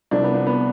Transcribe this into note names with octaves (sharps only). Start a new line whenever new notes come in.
C2 C3 F3 D4
B3
B3
B3